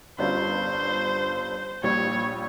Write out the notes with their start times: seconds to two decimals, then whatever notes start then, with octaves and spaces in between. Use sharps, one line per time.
0.18 G1 G2 G3 C#4 F4 C5
1.83 A#1 A#2 G3 C#5